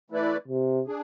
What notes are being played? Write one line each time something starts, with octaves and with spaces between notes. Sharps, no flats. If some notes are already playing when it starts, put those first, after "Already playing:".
E3 A3 E4 B4 D5
C3
D4 G#4